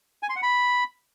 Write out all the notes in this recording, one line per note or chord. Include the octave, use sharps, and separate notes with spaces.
G#5
C6
F#5
B5